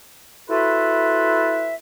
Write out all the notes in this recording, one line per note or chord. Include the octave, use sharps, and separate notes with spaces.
E4 F#4 A4 B4 C5 E5